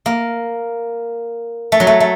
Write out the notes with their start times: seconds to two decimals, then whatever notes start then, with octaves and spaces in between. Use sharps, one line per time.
0.06 A#3
1.72 A3
1.80 F#3
1.87 A3
2.00 A3